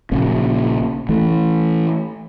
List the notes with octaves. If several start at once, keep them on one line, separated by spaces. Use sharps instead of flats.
A#1 C#3 A#3
E3 A3